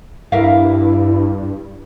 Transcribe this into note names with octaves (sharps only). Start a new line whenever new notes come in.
G2 E4 A#4 E5 F5